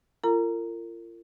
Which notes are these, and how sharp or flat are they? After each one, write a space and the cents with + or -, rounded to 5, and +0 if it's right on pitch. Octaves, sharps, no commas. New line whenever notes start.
F4 -35 A#4 -35 A#5 +0